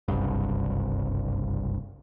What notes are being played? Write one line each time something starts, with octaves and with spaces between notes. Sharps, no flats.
F#1 C2 G2